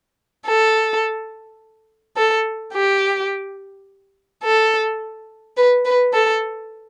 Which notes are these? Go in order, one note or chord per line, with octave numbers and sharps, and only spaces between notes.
A4
A4
G4
A4
B4
B4
A4